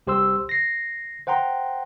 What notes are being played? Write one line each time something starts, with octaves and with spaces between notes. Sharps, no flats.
C2 G4 C5 C6 E6
A#6 C7
C5 F#5 G5 A#5 C6